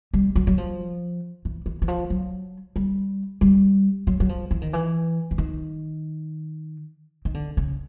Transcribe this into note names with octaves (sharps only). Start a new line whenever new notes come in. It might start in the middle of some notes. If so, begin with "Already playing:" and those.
G3
F#3
F#3
F3
E3
E3
E3
F3
F#3
G3
G3
F#3
F#3
F3
E3
D#3
E3
E3
D#3
D#3
D3
C#3